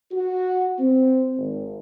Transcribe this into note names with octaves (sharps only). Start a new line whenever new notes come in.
F#4
C4
G#1